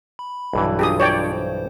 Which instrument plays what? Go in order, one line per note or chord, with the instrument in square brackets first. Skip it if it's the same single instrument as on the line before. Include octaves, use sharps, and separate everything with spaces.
[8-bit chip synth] B5
[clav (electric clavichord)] B1 G2 E3
[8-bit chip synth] D4 F4 [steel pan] G4 G#4 D#6
[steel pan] C#5 D5 G5
[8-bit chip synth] C5